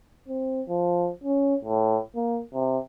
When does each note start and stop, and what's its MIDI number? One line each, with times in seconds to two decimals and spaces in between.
0.28 0.61 60
0.68 1.10 53
1.24 1.55 61
1.64 1.98 45
2.16 2.40 58
2.54 2.78 48